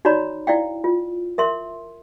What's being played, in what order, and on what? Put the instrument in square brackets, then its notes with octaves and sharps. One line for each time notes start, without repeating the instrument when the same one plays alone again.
[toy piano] D#4 F#4 C#5 D5 A#5 B5
E4 D5 F5 G5
F4
A#4 E5 C6